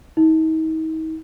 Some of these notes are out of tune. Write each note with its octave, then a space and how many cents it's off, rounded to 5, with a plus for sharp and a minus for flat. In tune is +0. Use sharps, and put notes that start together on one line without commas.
D#4 +40